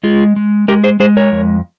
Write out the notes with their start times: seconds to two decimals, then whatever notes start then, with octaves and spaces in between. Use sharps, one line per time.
0.03 G#3 F4 G#4
0.36 G#3
0.68 G#3 G4 A#4
0.84 G#4 C5
1.00 G#3 G#4 C5
1.17 A#4 C#5
1.32 F2